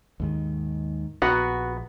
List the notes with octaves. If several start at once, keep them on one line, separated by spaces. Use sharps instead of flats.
D#2 G#2 D#3
A#1 B3 F#4 F#5 A#5